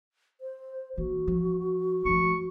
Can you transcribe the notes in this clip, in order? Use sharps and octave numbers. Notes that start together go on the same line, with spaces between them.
C5
E3 A#3 F#4
F3
F3 A3 C#6